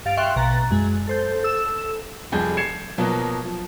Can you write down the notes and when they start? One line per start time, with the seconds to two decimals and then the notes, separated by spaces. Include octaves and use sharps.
0.05 G2 F5 A6 D7
0.17 E5 F5 G5 C6 C#6 F#6
0.36 A#1 B2 A#5 F#6 A6
0.71 F#2 G#3
1.07 A4 C5 G6
1.43 A4 E6 E7
2.32 F1 F2 G3 G#4 G#5 G6
2.57 G#6 C7 C#7 E7
2.98 B2 F3 F#3 A#3 B3
3.44 F3